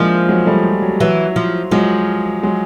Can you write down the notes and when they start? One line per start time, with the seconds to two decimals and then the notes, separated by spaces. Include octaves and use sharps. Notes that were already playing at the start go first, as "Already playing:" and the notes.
Already playing: F3 G#3 A#3 D4 E4
0.29 F#3 G#3
0.46 G3 A3
0.82 F#3
1.00 E3 F#3
1.36 F3
1.71 F3 F#3 G#3
2.43 F#3 G#3